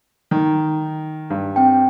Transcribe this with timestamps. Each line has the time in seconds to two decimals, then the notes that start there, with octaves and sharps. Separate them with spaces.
0.31 D#3
1.30 G2
1.56 C4 G5